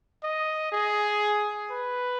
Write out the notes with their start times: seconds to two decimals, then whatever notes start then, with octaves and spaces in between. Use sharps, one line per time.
0.23 D#5
0.72 G#4
1.70 B4